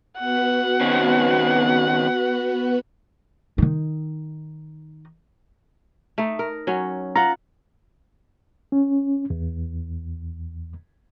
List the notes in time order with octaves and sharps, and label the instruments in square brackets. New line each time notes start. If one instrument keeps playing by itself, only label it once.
[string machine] B3 F#4 B4 [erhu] F#5
[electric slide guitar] D#3 C4 C#4
[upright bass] D#3 D#4
[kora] A3 D#4
A#4
F#3 C#4
[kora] F4 F#5 [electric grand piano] A#5
[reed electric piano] C#4
E2